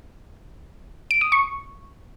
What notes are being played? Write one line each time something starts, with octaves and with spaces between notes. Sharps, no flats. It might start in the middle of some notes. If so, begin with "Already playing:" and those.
D7
D#6
C#6